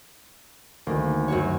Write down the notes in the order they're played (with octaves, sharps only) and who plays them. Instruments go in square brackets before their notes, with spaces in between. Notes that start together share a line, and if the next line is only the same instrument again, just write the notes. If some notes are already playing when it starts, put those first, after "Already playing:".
[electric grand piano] D2 D#3 [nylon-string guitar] A#3
[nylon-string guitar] F#2 F#4 C#5